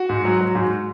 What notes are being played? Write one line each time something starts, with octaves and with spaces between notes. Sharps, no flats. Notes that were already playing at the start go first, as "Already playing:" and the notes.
Already playing: F#4
G#2
F#3
F#3
G#2